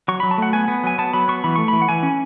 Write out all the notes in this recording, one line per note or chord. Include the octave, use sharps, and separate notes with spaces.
F#3 C#6
F#3 B5
A5
A3 F#5
B3 G#5
B3
F#3 G#5
B3 A5
F#3 B5
B3 C#6
E3 B5
A3 C#6
E3 B5
F#5
E3 G#5
C#4